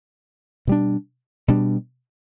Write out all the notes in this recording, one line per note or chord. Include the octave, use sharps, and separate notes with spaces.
B2 G3 D4
B2 G3 D4